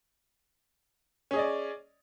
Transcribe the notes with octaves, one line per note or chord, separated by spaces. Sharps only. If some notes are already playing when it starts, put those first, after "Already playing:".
C#4 G#4 D5 D#5